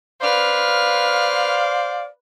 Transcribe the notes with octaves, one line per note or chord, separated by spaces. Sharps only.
B4 C5 D5 F5 F6